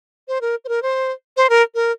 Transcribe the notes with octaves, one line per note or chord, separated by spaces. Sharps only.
C5
A#4
C5
A#4
C5
C5
A#4
A#4